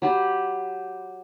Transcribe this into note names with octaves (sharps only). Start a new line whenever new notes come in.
F#3 G4 B5